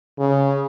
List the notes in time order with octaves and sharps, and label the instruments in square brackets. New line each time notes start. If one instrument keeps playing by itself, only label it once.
[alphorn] C#3